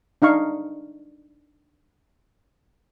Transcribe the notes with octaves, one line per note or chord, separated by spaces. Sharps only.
D4 D#4 F5 C#6